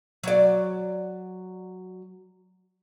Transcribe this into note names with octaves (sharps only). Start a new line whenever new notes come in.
F#3 D5